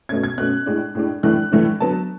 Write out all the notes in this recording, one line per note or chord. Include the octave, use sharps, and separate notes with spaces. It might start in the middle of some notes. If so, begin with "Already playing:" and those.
B2 A3 C#4 G#6
G#6
B2 A3 C#4 F#6
A2 G#3 D4
A2 G#3 D4
A2 E3 A3 D4 F#6
A2 E3 A3 D4
D3 F#3 B3 A5